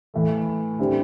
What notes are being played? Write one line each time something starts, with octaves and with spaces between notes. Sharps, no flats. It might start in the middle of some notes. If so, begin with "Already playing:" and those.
A2 E3 A3
D3 G3 C4 E4